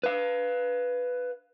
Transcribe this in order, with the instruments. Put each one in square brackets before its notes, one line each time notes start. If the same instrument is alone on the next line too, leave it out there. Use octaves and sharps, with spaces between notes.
[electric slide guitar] B4 F5